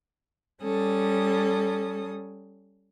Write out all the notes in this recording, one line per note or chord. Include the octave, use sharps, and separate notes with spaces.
G3 C#4 A4 D#6